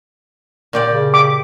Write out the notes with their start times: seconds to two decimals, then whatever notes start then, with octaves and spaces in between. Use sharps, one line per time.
0.73 A#2 G4 D5
0.90 C#3
1.14 D6